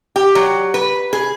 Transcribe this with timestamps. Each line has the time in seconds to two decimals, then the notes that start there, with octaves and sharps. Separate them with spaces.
0.16 G4
0.35 F#3
0.74 B4
1.13 G#4